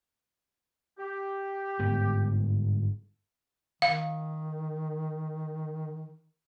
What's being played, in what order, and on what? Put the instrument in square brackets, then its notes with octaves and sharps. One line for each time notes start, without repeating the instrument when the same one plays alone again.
[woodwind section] G4
[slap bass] G1 G#2 B3
[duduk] D#3 [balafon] F5